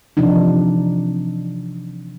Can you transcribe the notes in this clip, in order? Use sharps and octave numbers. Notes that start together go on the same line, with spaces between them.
C3 E3 F3 D4 D#4